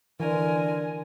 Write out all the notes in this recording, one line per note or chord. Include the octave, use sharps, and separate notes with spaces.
D3 E3 A#4 G#5